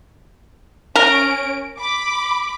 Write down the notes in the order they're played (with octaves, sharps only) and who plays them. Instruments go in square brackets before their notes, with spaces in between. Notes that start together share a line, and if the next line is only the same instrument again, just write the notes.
[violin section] C#4 D7 [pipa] A#4
[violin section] B5 D6